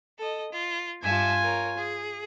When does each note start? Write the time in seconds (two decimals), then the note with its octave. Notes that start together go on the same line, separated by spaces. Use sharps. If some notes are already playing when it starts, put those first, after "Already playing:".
0.18 A4 D#5
0.51 F4
1.03 G2 F4 E5 G#5 A5
1.43 A#4 C#5
1.76 G#4